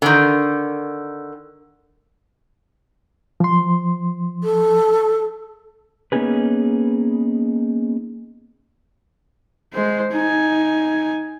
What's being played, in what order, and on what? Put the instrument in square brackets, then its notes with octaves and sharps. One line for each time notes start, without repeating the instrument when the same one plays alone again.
[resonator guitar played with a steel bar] D3 D#3
[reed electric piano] F3 C6
[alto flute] A4
[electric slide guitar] A#3 B3 C#4 D#4 G#4 B4
[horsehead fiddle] G#3 C5
D#4 G#5